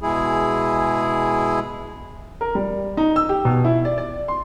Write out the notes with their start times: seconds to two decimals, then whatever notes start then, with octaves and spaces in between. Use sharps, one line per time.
0.01 B2 G#3 E4 G#4
2.41 A#4
2.55 G3
2.97 D#4
3.16 E6
3.29 G4
3.45 B2
3.65 E4
3.85 D5
3.98 D5
4.28 C6